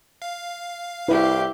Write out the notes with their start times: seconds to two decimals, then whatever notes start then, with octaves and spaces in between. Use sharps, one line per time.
0.22 F5
1.08 C2 E4 G4 B4 E5